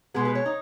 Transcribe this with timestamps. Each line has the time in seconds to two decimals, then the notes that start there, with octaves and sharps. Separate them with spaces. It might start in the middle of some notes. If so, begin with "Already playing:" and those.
0.14 B2 G#3 B3 G#4
0.25 B4
0.35 C#5
0.46 D#4